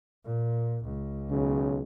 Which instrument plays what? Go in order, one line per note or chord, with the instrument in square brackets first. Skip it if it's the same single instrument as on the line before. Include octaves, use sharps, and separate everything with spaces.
[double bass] A#2
C#2
[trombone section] B1 C#3